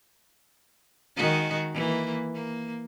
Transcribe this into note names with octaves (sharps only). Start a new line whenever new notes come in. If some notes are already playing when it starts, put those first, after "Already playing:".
D#3 G#3 F#4
E3 A#3
A#3